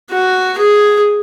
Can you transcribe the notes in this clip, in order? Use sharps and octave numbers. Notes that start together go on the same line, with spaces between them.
F#4
G#4